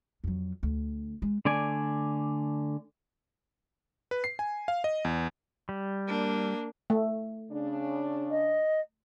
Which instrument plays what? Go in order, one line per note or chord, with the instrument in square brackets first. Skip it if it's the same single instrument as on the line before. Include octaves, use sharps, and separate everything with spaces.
[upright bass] F2 F#3
D2
G#3
[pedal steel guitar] D3 A3 D5 G#5
[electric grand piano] B4
C7
G#5
F5
D#5
E2
[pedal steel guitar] G3
[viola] A#3 D4
[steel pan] A3
[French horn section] C#3 D4
[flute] D#5